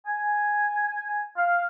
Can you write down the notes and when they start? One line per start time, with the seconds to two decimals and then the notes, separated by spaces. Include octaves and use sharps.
0.07 G#5
1.37 F5